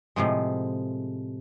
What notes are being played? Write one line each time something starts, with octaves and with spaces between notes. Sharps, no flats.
A2 C3 F3 G#3